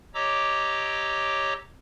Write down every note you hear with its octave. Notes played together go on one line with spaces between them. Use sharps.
G4 C#5 D#5 A#5 D6 E6